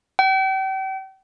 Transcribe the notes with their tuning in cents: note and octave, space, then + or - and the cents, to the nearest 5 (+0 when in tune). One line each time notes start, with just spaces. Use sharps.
G5 -40